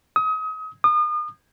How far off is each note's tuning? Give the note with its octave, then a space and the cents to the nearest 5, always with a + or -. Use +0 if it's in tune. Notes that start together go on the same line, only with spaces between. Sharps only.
D#6 +35
D#6 -35